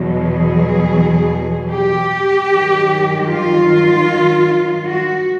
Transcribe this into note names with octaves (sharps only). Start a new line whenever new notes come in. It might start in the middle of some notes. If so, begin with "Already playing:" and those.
Already playing: E2 B2 F#3
G#4
G4
G2 D#3 F#3
F4
F#4